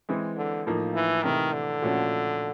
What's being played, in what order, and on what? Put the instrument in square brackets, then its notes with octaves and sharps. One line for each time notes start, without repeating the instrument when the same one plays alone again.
[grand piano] E3 G#3 C4
[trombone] D3
[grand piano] A2 F3 A#3 D#4
[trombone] E3
[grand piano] C3 E3 A3 [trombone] D#3
[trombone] D3
[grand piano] A#2 F3 A3 C#4 F#4